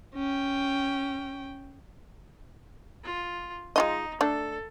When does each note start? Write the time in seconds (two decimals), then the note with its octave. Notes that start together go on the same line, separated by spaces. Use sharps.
0.15 C#4 G5
3.03 F4
3.76 G#3 D#4 F4 D#5
4.21 A3 D4 A4